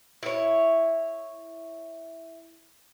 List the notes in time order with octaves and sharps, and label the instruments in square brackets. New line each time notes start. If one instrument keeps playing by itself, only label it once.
[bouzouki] E4 C#5